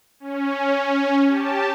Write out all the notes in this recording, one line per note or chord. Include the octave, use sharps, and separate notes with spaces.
C#4
G4 A5